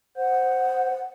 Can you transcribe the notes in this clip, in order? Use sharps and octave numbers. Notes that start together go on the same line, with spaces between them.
C5 F#5